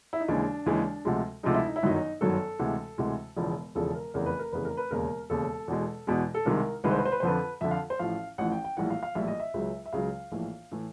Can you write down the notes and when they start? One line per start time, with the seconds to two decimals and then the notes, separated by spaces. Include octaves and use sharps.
0.13 E4
0.21 D#4
0.28 D#2 C#3 E3 G#3 D4
0.66 D#2 C#3 E3 G#3
1.05 D2 C3 F3 G#3
1.43 D2 C3 F3 G#3 D#4
1.54 E4
1.65 D#4
1.76 E4
1.83 G1 F#2 D#3 F#3 D#4
2.21 G1 F#2 D#3 F#3 A4
2.59 D2 C3 E3 G#3
2.98 D2 C3 E3 G#3
3.36 E1 E2 C#3 F3
3.75 E1 E2 C#3 F3 A4
3.95 A#4
4.14 F1 E2 C#3 A#4
4.26 B4
4.39 A#4
4.52 F1 E2 C#3 B4
4.65 A#4
4.77 B4
4.91 E1 D#2 C#3 A#4
5.30 E1 D#2 C#3 A4
5.68 E2 B2 G#3
6.07 E2 B2 G#3
6.35 A4
6.45 C2 C3 D#3 G#3 A#4
6.84 C2 C3 D#3 G#3 B4
6.91 C5
6.98 B4
7.05 C5
7.12 B4
7.20 C5
7.23 F2 D3 F3 B4
7.61 F2 D3 F3 E5
7.71 F5
7.90 C5
7.99 A1 A2 F3 F5
8.38 A1 A2 F3 F#5
8.52 G5
8.64 G5
8.77 A#1 A2 E3 G3 F#5
8.90 F5
9.03 F5
9.15 A#1 A2 E3 G3 E5
9.27 D#5
9.40 E5
9.54 C#2 C#3 F#3
9.86 E5
9.93 C#2 C#3 F#3 F5
10.32 A#1 A2 E3
10.72 A2 E3